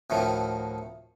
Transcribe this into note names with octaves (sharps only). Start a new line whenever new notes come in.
D2 A2 D#3 F3